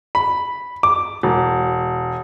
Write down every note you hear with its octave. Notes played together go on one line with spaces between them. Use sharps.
B5
D6
E1